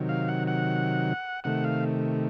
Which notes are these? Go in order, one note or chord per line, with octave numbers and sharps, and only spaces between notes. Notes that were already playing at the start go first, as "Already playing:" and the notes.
Already playing: C3 D#3 F#3
F5
F#5
F#5
C3 D#3 A3 F#5
F5